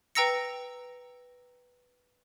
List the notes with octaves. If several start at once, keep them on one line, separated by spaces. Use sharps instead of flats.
B4 G5 A#5 E6 A#6 C#7